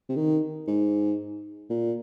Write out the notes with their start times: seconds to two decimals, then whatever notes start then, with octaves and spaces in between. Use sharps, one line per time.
0.09 C3
0.16 D#3
0.67 G#2
1.70 A#2